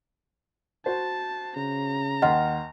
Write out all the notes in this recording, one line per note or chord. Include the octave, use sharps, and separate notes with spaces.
F#4 C5 A5
C#3 A#5
D#2 D#5 F#5 C6 F6